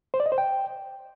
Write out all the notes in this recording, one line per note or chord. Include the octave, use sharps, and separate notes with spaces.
C5
D5
D#5
C5
G5